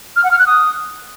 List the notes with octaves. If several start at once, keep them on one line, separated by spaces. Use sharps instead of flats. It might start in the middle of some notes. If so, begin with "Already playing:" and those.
F6
F#5
F6
F#6
D#6